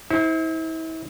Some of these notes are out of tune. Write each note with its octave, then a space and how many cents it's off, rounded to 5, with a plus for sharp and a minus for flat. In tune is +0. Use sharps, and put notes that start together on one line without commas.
E4 -40 C5 +0